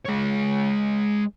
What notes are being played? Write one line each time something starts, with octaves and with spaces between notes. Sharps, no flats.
G#3 C#5